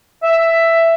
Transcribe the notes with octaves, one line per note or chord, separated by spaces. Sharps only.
E5